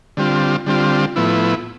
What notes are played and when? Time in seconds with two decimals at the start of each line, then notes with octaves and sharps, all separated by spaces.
0.17 D3 G3 C4 F4
0.66 D3 G3 C4 F4
1.16 A2 F3 B3 E4